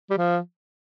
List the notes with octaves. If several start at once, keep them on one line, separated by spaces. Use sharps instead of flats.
G3
F3